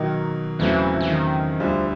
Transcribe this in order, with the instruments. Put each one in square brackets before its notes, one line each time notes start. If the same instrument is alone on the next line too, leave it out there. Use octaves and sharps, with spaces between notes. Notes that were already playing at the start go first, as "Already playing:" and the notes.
Already playing: [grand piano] B2 F#3 A#3 D#4 [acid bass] D#3
[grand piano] E2 C#3 F#3 A3 C4 [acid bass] E3
[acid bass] E3
D#3
[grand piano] D2 D3 G3 [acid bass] F3